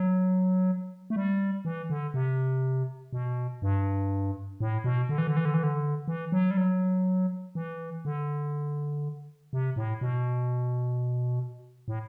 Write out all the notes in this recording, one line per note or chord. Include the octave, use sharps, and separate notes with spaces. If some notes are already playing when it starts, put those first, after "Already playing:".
Already playing: F#3
A3
G3
E3
D3
C3
B2
G2
A2
B2
D3
E3
D3
E3
D3
E3
D3
E3
F#3
G3
F#3
E3
D3
C3
A2
B2
A2